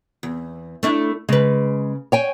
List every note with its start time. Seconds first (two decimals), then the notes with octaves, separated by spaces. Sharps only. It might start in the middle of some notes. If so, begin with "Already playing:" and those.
0.23 E2
0.83 A3 D4 E4
1.29 C#3 G#3 B4
2.12 C#5 G5 G#5